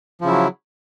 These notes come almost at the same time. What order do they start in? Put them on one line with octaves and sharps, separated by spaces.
F3 C#3 E4 F#3